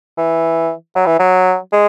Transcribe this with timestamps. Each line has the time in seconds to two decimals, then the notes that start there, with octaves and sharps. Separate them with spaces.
0.18 E3
0.95 F#3
1.07 E3
1.19 F#3
1.72 G#3